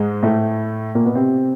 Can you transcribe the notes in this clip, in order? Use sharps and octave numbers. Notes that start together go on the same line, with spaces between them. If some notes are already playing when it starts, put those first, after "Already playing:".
Already playing: G#2 G#3
A2 A3
A#2 A#3
B2 B3
C3 C4